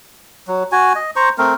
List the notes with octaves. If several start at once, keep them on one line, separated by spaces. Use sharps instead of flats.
F#3
F#4 G#5
D#5
C5 A#5 C#6
A3 C4 A#4